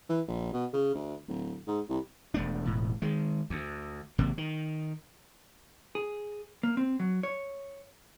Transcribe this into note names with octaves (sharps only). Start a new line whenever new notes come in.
E3
A#1
B2
C#3
D2
D1
G#2
C2
E1 A3 D4
E1 A2
D#3 G#3
D2
G#1 C3 A#3
D#3
G#4
A#3
C4
F#3
C#5